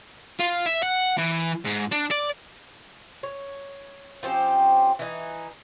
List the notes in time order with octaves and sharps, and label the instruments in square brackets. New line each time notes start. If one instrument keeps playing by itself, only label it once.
[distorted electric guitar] F4
E5
F#5
E3
G#2
D4
D5
[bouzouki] C#5
F3 C4 C#4 G4
E3 D#4